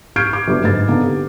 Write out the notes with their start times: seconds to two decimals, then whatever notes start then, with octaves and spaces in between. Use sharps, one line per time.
0.16 C#6 F6 G6 G#6 C7 D7
0.33 D6
0.48 G1 D3 F#3
0.64 G#2 A6
0.88 D3 A#3 B3 D#4 B4
1.04 G4